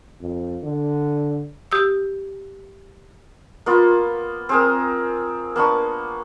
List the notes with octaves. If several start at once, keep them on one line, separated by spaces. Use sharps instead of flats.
F2
D3
G4 D#6 E6
A#3 B3 F4
C4 G#4 A#4
A#3 B3 D4 C#6